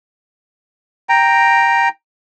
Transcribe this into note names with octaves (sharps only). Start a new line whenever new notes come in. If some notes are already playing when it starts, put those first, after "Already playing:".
G5 A#5